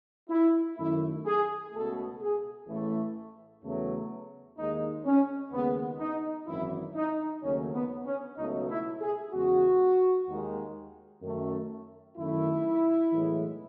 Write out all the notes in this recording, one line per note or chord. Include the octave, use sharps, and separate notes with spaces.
E4
F#2 D#3 A3 E4
G#4
C#2 B2 A3 A4
G#4
A1 A2 E3 A3
E2 C#3 F#3 A3
D#2 D#3 G#3 D#4
C#4
D#2 C#3 G#3 B3
D#4
G#1 F#2 E3 E4
D#4
D#2 C#3 F#3 A3 C#4
B3
C#4
C#2 B2 F#3 A3 D#4
E4
G#4
E2 C#3 G#3 F#4
D#2 D#3 G#3
F#2 D#3 A3
F#2 D#3 A3 E4
B1 A2 E3 G#3